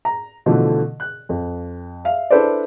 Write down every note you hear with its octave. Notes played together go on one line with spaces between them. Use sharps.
A#5
B2 D3 E3 F3 A3
F#6
F2
E5 F5
D4 E4 A4 B4 C5 D5